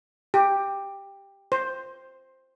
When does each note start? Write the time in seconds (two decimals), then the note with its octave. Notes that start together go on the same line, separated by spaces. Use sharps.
0.34 G4
1.52 C5